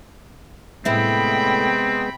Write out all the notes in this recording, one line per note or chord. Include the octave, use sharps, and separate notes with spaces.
A2 C3 G#3 B3 C4 E4 G5 B5